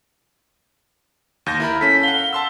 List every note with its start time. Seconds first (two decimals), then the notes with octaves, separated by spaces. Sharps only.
1.46 D#2 G6 A#6
1.60 E4 A#4 B5
1.81 C#4 A4 B6
2.03 F5 F#5 G7
2.33 A5 C6 E6